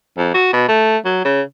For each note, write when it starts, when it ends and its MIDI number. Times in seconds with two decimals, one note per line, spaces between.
0.17 0.34 41
0.34 0.49 66
0.53 0.67 47
0.68 0.97 57
1.05 1.24 54
1.25 1.42 49